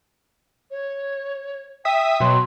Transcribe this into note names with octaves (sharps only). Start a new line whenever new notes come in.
C#5
E5 G5 D#6 B6
B2 F#3 C6